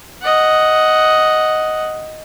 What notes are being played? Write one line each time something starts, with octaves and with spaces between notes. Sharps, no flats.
D#5 F#5